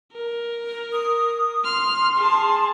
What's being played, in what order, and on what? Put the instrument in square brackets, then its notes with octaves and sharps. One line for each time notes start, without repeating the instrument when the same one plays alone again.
[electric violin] A#4
[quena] D#6
[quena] C6 [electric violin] F6
[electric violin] G#4 A5